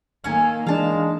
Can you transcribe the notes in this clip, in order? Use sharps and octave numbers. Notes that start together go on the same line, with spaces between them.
D#3 A#3 C#4 A4 G#5
E3 G#3 D4 F5 A5